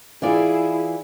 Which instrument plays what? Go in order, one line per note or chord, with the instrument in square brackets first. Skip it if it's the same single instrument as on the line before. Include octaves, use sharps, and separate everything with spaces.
[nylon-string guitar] E3 F4 D5 [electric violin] E4 G#4